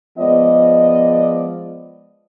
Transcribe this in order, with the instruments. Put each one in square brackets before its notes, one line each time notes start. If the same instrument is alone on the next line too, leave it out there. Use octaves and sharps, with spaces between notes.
[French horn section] F3 G#3 B3 D5 D#5